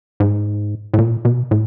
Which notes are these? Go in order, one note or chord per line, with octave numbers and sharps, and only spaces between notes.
G#2
A2
A#2
B2
A2